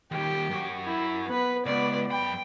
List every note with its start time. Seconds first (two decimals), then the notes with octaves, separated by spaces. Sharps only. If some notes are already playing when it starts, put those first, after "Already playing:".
0.11 D#2 G3 G4
0.50 F#2 F#4
0.84 E4
1.27 B3 B4
1.66 C#2 B3 D5
2.11 F#2 G5 B5